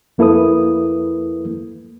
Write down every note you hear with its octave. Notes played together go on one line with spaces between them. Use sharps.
F2 A#3 E4 A4 B4 D#6